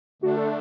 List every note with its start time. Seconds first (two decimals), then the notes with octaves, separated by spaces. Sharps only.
0.22 D3 A3 D4 F#4
0.37 A4